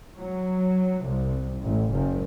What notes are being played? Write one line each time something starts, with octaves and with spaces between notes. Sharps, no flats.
F#3
C2
A1
F#1